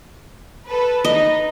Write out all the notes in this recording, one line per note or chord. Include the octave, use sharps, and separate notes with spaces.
A4 B4
D#4 B4 D#5